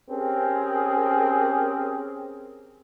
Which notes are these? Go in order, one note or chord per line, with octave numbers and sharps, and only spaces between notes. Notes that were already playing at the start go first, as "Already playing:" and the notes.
C4 C#4 G4 G#4 A#4